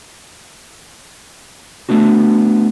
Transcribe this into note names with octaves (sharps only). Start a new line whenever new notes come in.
A3 B3 D4 F#4